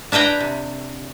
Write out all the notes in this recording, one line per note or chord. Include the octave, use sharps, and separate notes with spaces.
D4 E4 B4 G5 A#5
C3